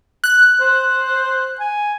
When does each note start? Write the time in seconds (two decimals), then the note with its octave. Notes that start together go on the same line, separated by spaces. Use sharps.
0.24 F#6
0.61 C5
1.60 G#5